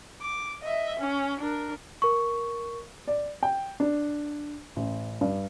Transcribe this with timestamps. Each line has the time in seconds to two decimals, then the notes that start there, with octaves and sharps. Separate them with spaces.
0.21 D6
0.62 D#5 E5
0.99 C#4
1.40 D4 A#4
2.02 A#4 C#6
3.08 D5
3.43 G5
3.80 D4
4.76 A1
5.21 G2